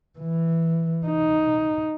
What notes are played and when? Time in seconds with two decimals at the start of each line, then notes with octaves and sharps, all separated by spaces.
0.19 E3
1.07 D#4